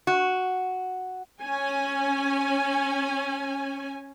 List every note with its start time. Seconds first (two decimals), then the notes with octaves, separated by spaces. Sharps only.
0.07 F#4
1.40 C#4 G#5